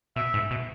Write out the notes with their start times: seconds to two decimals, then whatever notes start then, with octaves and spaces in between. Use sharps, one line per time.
0.16 B2 E5
0.34 G#2
0.51 B2